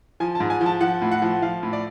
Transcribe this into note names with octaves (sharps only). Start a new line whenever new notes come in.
F3 G#5
A5
G#2
G#5
F3
A5
F3 F#5
A2
F#5
F3
F3 F5
A2
D5